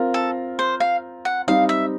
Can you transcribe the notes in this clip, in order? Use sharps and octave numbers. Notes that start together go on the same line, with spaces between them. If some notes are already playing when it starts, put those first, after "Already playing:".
Already playing: C4 F4 A#4
A4
C5
F5
F#5
G3 C4 D#4 F5
E5